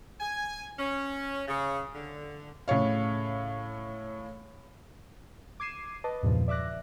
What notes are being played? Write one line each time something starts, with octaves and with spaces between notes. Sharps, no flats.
G#5
C#4
C#3
D3
A2 C#3 C#5 F5
D6 G#6 C7 D#7 E7
B4 D#5 A5 D6
E2 G2 A#2 C#3 F3
D5 E5 D6 F#6 A#6